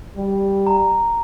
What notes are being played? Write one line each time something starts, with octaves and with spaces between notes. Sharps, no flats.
G3
A#5